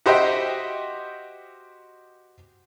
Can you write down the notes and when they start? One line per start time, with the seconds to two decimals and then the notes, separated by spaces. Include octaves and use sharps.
0.06 F#4 G4 C5 D#5 E5 G5